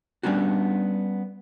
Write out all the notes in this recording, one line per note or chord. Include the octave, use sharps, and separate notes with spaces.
G3 B3 C#4 D4 F#4